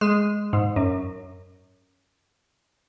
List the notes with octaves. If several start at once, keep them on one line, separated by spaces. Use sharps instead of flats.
G#3
G#2
F#2